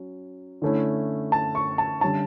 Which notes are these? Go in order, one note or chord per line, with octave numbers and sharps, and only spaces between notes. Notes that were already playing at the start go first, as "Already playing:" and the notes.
Already playing: F#3 C#4
D3 A3 C#4 E4
A5
C#6
A5
D3 G3 C#4 A5